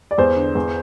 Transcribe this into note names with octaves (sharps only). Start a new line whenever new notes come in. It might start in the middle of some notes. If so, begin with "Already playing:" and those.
D5
E2 C5
D3
E2